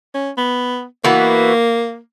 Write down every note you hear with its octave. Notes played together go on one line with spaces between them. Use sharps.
C#4
B3
E3 A#3 B3 F#4